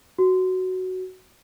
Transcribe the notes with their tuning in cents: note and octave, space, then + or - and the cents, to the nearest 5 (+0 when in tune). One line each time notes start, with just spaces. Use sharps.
F#4 +5